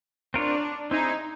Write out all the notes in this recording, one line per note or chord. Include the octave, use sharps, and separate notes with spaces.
C4 D4 F4 A#4 C#5
C4 D#4 E4 G#4